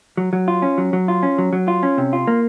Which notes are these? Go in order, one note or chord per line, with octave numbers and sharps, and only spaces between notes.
F#3
F#3
F4
C#4
F#3
F#3
F4
C#4
F#3
F#3
F4
C#4
C3
F4
A#3